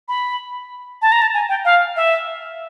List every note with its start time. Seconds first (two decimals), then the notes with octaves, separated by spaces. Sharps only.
0.08 B5
1.02 A5
1.12 A#5
1.22 A5
1.34 G#5
1.49 G5
1.65 F5
1.96 E5